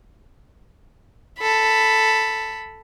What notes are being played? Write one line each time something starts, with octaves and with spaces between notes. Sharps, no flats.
A4 B5